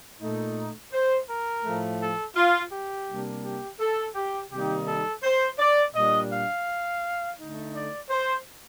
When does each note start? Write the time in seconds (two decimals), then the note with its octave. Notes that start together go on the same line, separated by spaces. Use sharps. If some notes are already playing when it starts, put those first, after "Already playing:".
0.21 A#2 A3 D#4
0.93 C5
1.29 A#4
1.65 A2 F3 A3
2.01 A4
2.36 F4
2.72 G4
3.08 C3 G3 A#3 D4
3.44 G4
3.80 A4
4.15 G4
4.52 C3 D#3 G3 A#3 D#4 G4
4.87 A4
5.24 C5
5.59 D5
5.95 A#2 G3 D4 D#5
6.31 F5
7.39 D3 A3 D#4
7.74 D5
8.10 C5